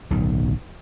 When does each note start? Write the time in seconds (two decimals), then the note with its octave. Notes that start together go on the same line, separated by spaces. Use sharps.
0.10 D1 B1 D#3